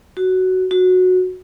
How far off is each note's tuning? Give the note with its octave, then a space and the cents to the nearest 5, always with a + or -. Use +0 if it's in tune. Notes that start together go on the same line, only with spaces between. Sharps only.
F#4 +10
F#4 -10